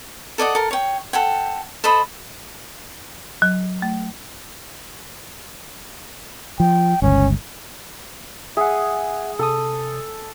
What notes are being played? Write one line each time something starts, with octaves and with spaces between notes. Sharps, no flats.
A4 D5 D#5 F#5
A4 A#4
C#5 G5
A4 F#5 G5
A4 C5 D#5 B5
F#3
A3
F3 G5
G1 C#2 C#4
G#4 E5 F#5
C3 A4 D#6